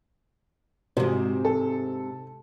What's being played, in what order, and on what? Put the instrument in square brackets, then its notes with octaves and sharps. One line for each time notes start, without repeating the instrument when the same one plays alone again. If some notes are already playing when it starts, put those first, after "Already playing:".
[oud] G#2 C3 [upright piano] F#4 G4 C5
[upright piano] A4